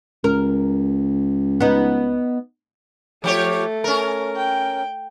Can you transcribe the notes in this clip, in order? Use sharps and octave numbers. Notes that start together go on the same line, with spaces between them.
C#2 A#4
B3 D#4
F3 A3 G4 C#5
C#4 A#4
G5